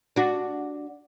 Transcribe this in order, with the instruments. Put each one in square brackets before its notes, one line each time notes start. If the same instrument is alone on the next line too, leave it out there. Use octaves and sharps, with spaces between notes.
[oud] D4 F#4